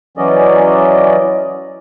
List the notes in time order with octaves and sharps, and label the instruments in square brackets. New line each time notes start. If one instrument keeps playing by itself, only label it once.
[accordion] E3 F#3 C#4 D5 D#5